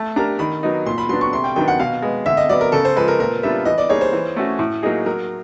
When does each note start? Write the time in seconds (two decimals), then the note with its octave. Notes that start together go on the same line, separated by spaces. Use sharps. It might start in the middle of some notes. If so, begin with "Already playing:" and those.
Already playing: A3 A5
0.16 D4 G4 A#4 A#5
0.39 D#3 B5
0.63 F#3 B3 D#4
0.86 A#2 C6
0.98 B5
1.09 F#3 B3 D4 C6
1.21 C#6
1.33 C3 C6
1.44 G5
1.56 D#3 F#3 B3 D4 G5
1.68 F#5
1.80 B2 F5
2.02 G#3 B3
2.26 D3 E5
2.37 D#5
2.49 F#3 B3 D5
2.61 A#4
2.72 C#3 A4
2.85 C5
2.96 F3 G#3 B4
3.08 A#4
3.20 A#2 A#4
3.43 G3 B3 D4 F4 E5
3.65 E3 D#5
3.78 D5
3.89 G3 A#3 D#4 G#4 C#5
4.01 C5
4.13 E3
4.36 A3 C#4 F#4
4.59 A2
4.83 F#3 A#3 D#4 G#4
5.06 F#3 A#4